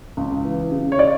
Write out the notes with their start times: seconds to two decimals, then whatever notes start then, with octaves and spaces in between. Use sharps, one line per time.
0.17 C#2
0.45 E3
0.72 C#3
0.92 C#5
0.99 D5